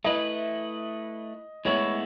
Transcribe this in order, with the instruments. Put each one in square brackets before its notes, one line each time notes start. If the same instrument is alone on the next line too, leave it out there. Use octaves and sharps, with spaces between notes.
[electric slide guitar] A3 E4 B4 [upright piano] D#5
[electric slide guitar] A2 G#3 B3 E4 [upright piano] C#5